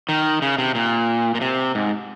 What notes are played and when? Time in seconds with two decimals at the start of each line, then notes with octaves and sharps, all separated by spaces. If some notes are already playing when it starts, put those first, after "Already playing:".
0.09 D#3
0.42 C#3
0.58 C3
0.75 A#2
1.35 A#2
1.41 C3
1.75 G#2